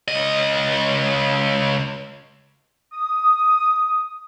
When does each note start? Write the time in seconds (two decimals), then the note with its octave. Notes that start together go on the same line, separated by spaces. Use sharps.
0.08 C#2 D#5
2.93 D#6